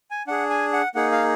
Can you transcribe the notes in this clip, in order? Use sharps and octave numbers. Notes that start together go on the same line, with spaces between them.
G#5
D4 G#4 F#5
G#5
F#5
A#3 D#4 G#4 F#5
F5